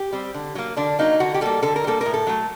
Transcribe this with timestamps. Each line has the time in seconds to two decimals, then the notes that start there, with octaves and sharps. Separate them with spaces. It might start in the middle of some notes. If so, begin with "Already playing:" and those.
Already playing: G4
0.12 G3 C4
0.34 D3
0.55 F#3 A#3
0.77 D3 D4
0.99 F#3 A#3 D#4
1.20 D3 F#4
1.34 G4
1.41 G3 A#3 A4
1.62 D3 A4
1.76 A#4
1.84 G3 A#3 A4
2.01 A2 A#4
2.14 A4
2.27 F#3 A3